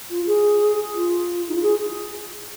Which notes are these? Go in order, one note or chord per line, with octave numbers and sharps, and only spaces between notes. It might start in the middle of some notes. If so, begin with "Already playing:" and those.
F4
G#4
F4
D#4
F4
G#4